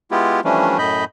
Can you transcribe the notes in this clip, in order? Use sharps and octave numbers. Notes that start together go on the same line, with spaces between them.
G#3 B3 E4 F4 G4
E3 F3 G3 A3 C#4 D4
F#2 A2 D#5 B5 G6